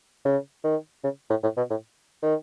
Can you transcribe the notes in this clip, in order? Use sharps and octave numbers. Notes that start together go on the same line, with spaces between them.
C#3
D#3
C#3
A2
A2
B2
A2
D#3